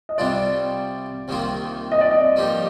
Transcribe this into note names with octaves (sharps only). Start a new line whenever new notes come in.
D#5
C2 C3 G3 D4 F4 D5
C2 C3 D#3 A#3 F4
D#5
D5
D#5
G2 F3 A#3 D#4 G4